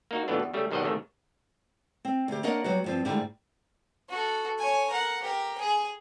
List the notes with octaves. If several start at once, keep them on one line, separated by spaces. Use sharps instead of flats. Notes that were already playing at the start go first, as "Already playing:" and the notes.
A#3 D#4 F#4
F2 B2 E3 A3 B3 D4
E2
C#3 G3 A3
B1 D#3 G3 C5 D#5 F#5
A1 C3 D#3 A3
C4
D2 G4
A#3 D4 A#4 C#5 D#5 F#5
F#3 G3 B3 F#4
G2 F3 C4
G#2 D3 D#3 G3 A3 E4
F#4 A4
C#5 G#5
A#4 F#5
G4 A#4
G#4 G#5